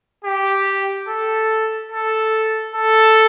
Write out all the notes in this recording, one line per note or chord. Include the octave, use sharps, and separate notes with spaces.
G4
A4
A4
A4